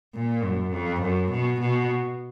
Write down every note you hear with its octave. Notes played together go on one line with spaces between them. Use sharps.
A#2
F#2
F2
F#2
B2
B2